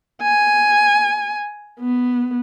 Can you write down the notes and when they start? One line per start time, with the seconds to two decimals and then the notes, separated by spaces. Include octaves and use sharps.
0.22 G#5
1.80 B3